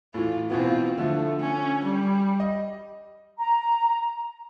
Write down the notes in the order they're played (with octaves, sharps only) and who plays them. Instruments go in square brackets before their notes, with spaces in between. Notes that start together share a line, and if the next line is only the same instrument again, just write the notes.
[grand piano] A2 E3 [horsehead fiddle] F4
[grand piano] B2 E3 B3 [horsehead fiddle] C4 F4
[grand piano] D3 F3 [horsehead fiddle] A3
[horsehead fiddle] C#4
G3
[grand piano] D#5
[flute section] A#5